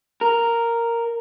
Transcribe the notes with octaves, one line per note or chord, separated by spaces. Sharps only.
A#4